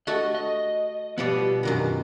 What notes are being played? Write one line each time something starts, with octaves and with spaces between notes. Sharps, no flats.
A3 F#4 A4 D#5
D#5
B2 F3 G3 B3 D5
F#2 A#2 D#3